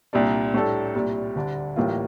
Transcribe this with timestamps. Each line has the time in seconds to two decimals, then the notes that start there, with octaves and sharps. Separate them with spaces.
0.13 C2 A#2 G3 D4
0.54 A2 G3 D4 A4
0.95 C2 A#2 G3
1.35 D2 D3 G3 D4
1.76 A1 A2 G3 A#3 F4